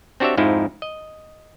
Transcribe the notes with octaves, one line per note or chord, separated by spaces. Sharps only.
C4 D4 F#4 G4 C#5 E5
F2 G#2 F3 D#4 E4
D#5